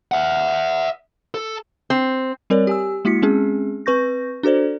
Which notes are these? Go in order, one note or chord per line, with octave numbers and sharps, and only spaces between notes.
E5 F#5
A4
C4
G3 C4 A#4 C#5 D5
G4 G#5 E6
G#3 A#3 E4 F#4 B6 C#7
G#3 C4 C#4 G#4
C4 B4 C#6 G6 A#6
D4 F#4 A4 C5 D5